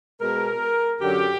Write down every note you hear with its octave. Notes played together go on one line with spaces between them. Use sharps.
B2 G#3 A#4
F#2 D3 F#3 G4